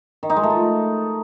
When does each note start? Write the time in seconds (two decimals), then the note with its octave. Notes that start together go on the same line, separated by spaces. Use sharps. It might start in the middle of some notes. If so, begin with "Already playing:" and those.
0.23 D#3
0.30 D#4
0.36 G#3
0.43 A3
0.50 F4